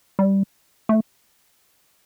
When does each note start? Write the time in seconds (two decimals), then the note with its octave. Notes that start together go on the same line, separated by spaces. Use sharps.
0.19 G3
0.89 A3